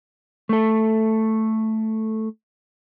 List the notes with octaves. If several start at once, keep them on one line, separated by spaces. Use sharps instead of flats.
A3 A4